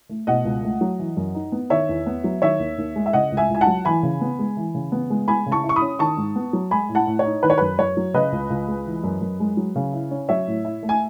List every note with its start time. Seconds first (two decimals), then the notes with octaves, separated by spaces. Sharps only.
0.09 A3
0.27 B2 D#5 F#5
0.45 C#2
0.63 A3
0.81 F#3
0.99 E3
1.17 F#2
1.34 D#4
1.52 B3
1.70 D#3 C#5 E5
1.89 E2
2.06 B3
2.24 F#3
2.42 D#3 C#5 E5
2.59 D#2
2.78 D#2
2.96 G#3
3.06 E5
3.13 C#3 D#5 F#5
3.32 C#2
3.37 E5 G#5
3.49 C#2
3.55 G#5
3.61 F#5 A5
3.67 F#3
3.85 E3 G#5 B5
4.03 C#3
4.21 B3
4.39 G#3
4.57 E3
4.75 C#3
4.92 B3
5.10 G#3
5.28 G#3 G#5 B5
5.46 C#3
5.52 A5 C#6
5.64 E4
5.69 C#6
5.76 B5 D#6
5.82 C#4
5.99 D#3 A5 C#6
6.17 G#2
6.35 B3
6.53 F#3
6.71 G#3 G#5 B5
6.89 A2
6.95 F#5 A5
7.07 A2
7.19 C#5
7.25 D#4
7.43 D#3 B4
7.50 C#5
7.58 F#2 B4
7.79 F#2 C#5
7.97 F#3
8.14 C#3 B4 D#5
8.32 C#2
8.50 C#2
8.68 G#3
8.86 E3
9.04 F#2
9.21 F#2
9.40 G#3
9.57 F#3
9.76 C#3
9.93 E4
10.11 C#4
10.29 F#3 C#5 E5
10.47 A2
10.65 E4
10.83 A3
10.89 G#5